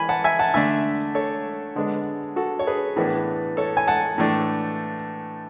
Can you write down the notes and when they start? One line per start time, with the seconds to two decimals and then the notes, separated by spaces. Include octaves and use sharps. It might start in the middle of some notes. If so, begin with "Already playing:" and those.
Already playing: E3 G#5 B5
0.09 F#5 A5
0.24 E5 G#5
0.39 F#5 A5
0.54 D3 A3 D4 E5 G#5
1.15 A4 C#5
1.76 D3 G#3 B3 D4
2.36 F#4 A4
2.59 C#5
2.67 G#4 B4
2.96 A2 E3 B3 D4
3.57 A4 C#5
3.77 G#5
3.87 F#5 A5
4.18 A2 E3 A3 D4